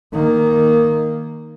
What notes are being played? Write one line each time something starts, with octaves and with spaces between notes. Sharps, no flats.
D#3 A#3